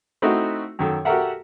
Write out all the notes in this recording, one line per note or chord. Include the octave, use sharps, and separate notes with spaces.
A3 C4 D#4 E4 F#4 E5
F#2 D#3 A4
F#4 G4 A4 A#4 E5 F#5